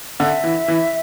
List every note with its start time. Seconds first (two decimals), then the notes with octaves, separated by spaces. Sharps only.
0.20 D3 E5
0.44 E3
0.68 E3